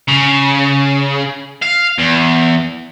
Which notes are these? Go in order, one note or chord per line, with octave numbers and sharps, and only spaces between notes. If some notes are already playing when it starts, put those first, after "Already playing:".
C#3
F5
E2